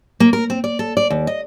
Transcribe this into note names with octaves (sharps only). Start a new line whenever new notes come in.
A#3
A#4
C4
D5
A4
D5
D#2
D#5